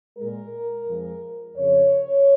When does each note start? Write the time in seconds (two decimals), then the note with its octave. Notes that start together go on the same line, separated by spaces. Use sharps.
0.18 A#2 G#3 A#4
0.87 F2 F3 G#3
1.57 F2 C#3 F3 C#5